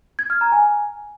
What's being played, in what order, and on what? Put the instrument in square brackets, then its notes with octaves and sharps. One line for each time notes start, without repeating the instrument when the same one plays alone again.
[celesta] G#6
F6
A#5
G#5